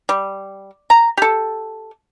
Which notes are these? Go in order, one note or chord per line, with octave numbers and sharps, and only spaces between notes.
G3
A#5
G4 A4